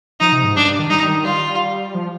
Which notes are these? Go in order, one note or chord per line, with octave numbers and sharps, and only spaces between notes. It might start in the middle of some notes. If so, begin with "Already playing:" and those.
F3 D#4
C3
G#2
G2 D4
G2
D#3
G3 D#4
D#3
G3 F4
F3